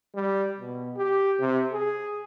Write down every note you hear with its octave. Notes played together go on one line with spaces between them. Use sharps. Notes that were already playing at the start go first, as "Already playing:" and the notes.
G3
B2
G4
C3
G#4